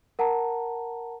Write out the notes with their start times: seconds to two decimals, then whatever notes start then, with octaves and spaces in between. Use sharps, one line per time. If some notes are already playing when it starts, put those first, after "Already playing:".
0.19 A#4 F#5 A5 A#5